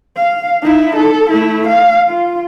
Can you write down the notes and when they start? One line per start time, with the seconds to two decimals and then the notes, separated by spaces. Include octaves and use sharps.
0.17 F5
0.62 D#4 E4
0.96 A4
1.30 A3 E4
1.68 F5
2.09 F4